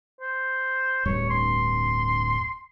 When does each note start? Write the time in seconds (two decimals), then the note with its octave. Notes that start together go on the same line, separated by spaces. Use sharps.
0.21 C5
1.06 D1 G2 C#5
1.30 C6